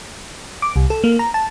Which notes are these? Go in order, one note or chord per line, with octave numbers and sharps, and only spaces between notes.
D6
C2
A4
A#3
A#5
A5